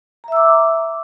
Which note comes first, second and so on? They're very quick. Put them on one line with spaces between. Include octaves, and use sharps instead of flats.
A#5 E5 E6 D6